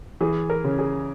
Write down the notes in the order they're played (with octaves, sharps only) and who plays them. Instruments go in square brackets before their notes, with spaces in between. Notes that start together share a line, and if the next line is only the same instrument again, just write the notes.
[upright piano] E3 G#4
A#4
C#3
G#4